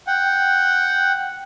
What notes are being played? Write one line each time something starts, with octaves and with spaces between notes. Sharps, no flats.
F#5 G5